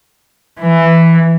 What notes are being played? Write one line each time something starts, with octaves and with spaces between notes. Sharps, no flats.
E3